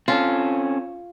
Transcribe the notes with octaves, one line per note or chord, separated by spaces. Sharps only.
C4 C#4 F4 A4